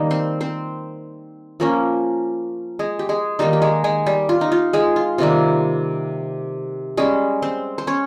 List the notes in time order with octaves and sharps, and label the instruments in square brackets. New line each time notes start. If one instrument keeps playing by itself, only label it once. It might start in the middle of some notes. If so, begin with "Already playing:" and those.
Already playing: [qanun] D#3 G3 A#3 D#4
C4 C5
C4 C5
F3 A#3 C#4
G#3 G#4
G4
G#3 G#4
D#3 G3 A#3 D#4 G4
G4
G#3 G#4
G#3 G#4
G3 G4
F4
D#4
F4
G#3 G#4
F4
C3 D#3 G3 A#3
G3 G#3 C#4 G#4
C4 C5
C5
C#4 C#5